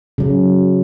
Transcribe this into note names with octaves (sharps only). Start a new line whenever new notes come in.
C#3 F#3